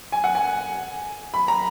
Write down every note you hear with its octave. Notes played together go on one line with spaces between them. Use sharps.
G#5
F#5
G#5
B5
A#5